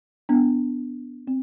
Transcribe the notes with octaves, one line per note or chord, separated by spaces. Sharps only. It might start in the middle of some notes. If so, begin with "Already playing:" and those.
B3 D4
C4